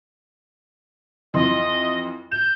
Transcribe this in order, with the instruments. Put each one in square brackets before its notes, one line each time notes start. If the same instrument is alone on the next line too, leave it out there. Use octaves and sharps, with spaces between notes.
[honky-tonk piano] F2 E3 C6 [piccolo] D#5
[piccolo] G6 [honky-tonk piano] E7